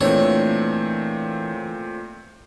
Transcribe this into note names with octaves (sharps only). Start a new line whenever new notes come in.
A#2 E3 A3 C4 D4 C#5